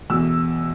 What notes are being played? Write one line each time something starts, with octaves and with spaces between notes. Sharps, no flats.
E2 B2 E6